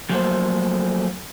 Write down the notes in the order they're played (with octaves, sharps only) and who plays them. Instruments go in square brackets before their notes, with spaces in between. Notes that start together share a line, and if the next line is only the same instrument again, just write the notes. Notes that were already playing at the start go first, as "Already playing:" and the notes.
[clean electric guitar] F3 F#3 A3 A#3 A4 C5